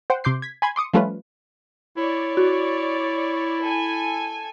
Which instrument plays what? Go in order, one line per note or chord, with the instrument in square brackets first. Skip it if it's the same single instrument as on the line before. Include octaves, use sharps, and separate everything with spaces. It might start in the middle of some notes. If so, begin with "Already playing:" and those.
[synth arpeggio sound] C5 F#5 G5
C3 C6 D6 G6 C7
G#6 B6
G#5 B5 C6 G#6
C6 D6 D#6 C#7
F3 G3 A3 C#4 F4 B4
[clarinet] E4 [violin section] C#5 D5
[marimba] F#4
[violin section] A4 G#5